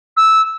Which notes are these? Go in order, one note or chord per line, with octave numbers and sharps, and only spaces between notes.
E6